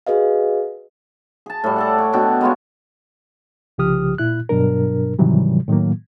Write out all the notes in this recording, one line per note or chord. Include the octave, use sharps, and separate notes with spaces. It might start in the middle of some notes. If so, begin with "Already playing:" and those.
F#4 G#4 B4 D#5 F5
G#4 A5
A2 G3
A4 D5 F#5
C#5
B2 D4 G5
G#3 B3 F4 C#5
C2 C#3 F3 G4 D#6 F6
A#2 E4 F#6
G2 B2 F#3 D4 A#4
G#2 C3 D#3 E3 F#3 G3
A2 D#3 F#3 A#3